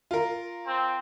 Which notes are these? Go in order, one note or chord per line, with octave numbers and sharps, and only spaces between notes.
F4 A#4
C4